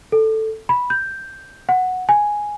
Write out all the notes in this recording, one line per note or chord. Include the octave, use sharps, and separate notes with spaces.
A4
B5
G6
F#5
G#5